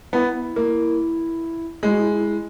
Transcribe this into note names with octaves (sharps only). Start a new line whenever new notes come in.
B3 E4
A#3
G#3 E4
F#4
E4
E4